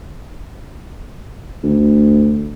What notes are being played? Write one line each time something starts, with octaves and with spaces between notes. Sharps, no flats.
D2